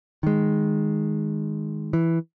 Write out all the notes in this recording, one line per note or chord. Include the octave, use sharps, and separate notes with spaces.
D#3 G#3
E3